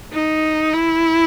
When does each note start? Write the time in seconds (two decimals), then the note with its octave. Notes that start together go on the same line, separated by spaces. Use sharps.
0.13 D#4
0.73 E4